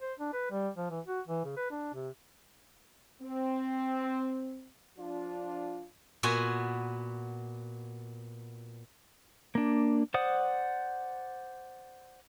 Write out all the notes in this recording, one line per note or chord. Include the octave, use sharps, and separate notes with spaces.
C5
D4
B4
G3
F3
E3
F#4
E3
C#3
B4
D4
C3
C4
F3 D4 F4
A#2 B3 F#4 G#5
A#3 D4
C5 D5 F#5 D#6